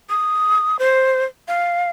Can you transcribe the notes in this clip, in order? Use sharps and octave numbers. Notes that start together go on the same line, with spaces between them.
D#6
C5
F5